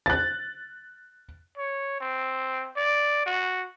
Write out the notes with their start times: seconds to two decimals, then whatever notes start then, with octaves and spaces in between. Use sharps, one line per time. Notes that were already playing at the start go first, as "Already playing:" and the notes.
0.06 F#6 A6
1.58 C#5
2.01 C4
2.77 D5
3.26 F#4